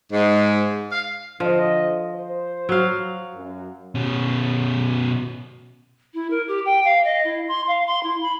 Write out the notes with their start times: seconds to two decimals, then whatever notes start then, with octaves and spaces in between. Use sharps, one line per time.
0.13 G#2
0.92 F5
1.40 D3 F3 D#5
2.14 C5
2.69 F#3 F5
3.34 F#2
3.95 B2 C#4
6.14 E4
6.30 A#4
6.47 G4
6.65 G5
6.84 F5
7.04 D#5
7.24 E4
7.48 C6
7.67 F5
7.86 C6
8.03 E4
8.21 B5